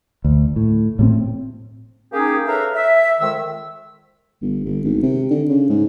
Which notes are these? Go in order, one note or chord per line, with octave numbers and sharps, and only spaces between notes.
D2
A2
A2 F#3 C4
A#3 C#4 D#4 G4 G#4
A4 B4 C#5 E5 F5 A#5
E5
F2 D#3 G#3 E6
G1
G1
G#1
C3
D3
C#3
G#2